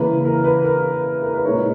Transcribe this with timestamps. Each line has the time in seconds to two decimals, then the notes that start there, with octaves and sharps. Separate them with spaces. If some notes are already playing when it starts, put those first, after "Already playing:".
Already playing: C#3 E3 A#3 B4
0.25 A#4
0.44 B4
0.64 A#4
1.23 A#4
1.34 B4
1.45 A#2 G#3 D#4 A#4 C#5